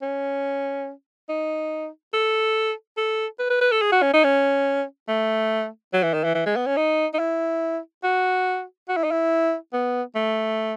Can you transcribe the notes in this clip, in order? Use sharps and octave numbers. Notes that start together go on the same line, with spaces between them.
C#4
D#4
A4
A4
B4
B4
B4
A4
G#4
F#4
C#4
D#4
C#4
A3
F#3
E3
D#3
E3
E3
G#3
B3
C#4
D#4
D#4
E4
F#4
F#4
E4
D#4
E4
B3
A3